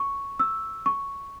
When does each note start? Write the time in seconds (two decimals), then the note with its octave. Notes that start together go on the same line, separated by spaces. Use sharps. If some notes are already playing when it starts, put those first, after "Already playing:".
Already playing: C#6
0.39 E6
0.86 C#6